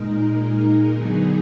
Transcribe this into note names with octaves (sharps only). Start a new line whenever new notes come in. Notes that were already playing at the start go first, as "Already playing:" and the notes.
Already playing: A#2 G#3 D#4 A#4
D3 F#3 B3 D#4 G#4